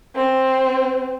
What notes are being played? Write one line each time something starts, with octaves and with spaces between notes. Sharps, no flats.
C4